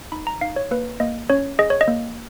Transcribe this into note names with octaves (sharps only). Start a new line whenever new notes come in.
D#4 B5
A#5
D#4 F5
C#5
A#3 B4
A#3 D#5
C#4 C#5
G#4 D#5
C#5
D#5
A#3